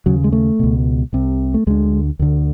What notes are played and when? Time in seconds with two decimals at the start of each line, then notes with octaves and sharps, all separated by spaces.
0.06 D#2 C#3 F#3
0.24 G#3
0.32 A3
0.59 C#2 B2
1.13 C2 C3
1.54 A3
1.67 D2 D3 G#3
2.19 D2 D3